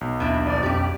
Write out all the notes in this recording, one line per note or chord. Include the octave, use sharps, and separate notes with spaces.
B1
D#2 B2 D4 E4
D#3 F3 D5
F2 C#4 G4 D5